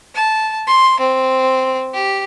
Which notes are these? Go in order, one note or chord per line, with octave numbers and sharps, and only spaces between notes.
A5
C6
C4
G4